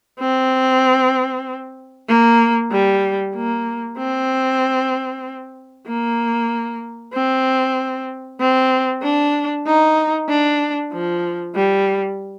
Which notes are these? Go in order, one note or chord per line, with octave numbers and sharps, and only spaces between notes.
C4
A#3
G3
A#3
C4
A#3
C4
C4
D4
D#4
D4
F3
G3